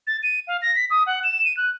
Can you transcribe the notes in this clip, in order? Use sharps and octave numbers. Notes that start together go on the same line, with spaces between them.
A6
D#7
F5
A#6
B6
D#6
F#5
E7
D#7
F#6